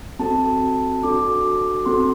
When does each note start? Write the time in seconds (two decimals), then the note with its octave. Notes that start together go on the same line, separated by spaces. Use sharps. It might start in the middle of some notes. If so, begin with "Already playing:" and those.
0.19 C4 F#4 A4 A5
1.03 D4 F#4 A4 D6
1.86 C4 F#4 A4 C6